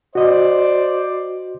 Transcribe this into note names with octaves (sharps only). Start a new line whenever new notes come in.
F#4 C5 D5 D#5